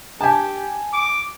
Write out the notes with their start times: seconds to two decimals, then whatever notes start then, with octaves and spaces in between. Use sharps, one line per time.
0.21 G4 G#5 A5
0.93 D6